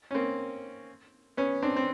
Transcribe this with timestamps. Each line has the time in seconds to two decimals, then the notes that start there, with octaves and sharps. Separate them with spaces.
0.11 C#4
0.15 A#3 C4
1.37 B3 C#4
1.62 C4 D4
1.76 C4